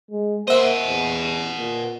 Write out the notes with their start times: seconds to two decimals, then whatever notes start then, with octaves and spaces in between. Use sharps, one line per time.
0.11 G#3
0.48 A#3 C5 D#5 E5 F#5
0.87 E2
1.57 A#2